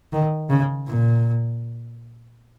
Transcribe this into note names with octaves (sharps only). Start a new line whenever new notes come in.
D#3
C#3
A#2